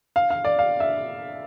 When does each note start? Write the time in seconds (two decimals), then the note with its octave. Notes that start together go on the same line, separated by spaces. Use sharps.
0.16 F5
0.30 F5
0.45 D5
0.59 F5
0.80 E5